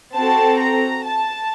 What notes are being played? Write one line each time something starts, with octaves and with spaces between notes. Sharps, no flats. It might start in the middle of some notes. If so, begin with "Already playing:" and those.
C4 F#4 A4 A5
A#5
A5